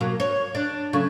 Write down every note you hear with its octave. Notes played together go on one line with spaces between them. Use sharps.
B2 F#3 A#3
C#5
D4
C#3 F#3 A3